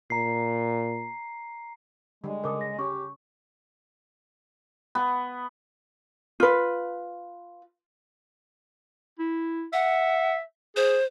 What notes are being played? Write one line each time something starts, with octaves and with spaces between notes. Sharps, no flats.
A#2 A#5 C7
D3 G3 G#3
C#3 A4 A#4 D6 D#6
A#6
C#4 G4 C#6
B3
F4 B4
E4
E5 F#5
G#4 C5